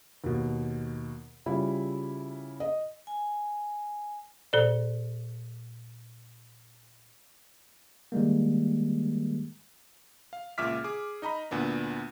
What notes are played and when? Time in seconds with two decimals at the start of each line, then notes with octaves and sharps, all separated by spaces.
0.24 D#2 B2
1.46 C#3 G3 E4 F4
2.60 D#5
3.07 G#5
4.53 A#2 A4 C5 D5
8.12 D#3 G3 G#3 A#3
10.33 F5
10.58 C#2 A#2 E5 D6 F6 B6
10.84 G#4 D6
11.22 D#4 D#5 A#5 B5
11.51 D2 A#2 B3 D4